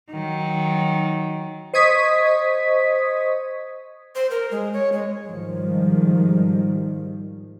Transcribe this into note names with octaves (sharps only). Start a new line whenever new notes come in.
D#3 F#3
C5 D#5 C#6 D#6 G#6 B6
C5
A#4
G#3
C#5
G#3
G#2 D#3 F3 G3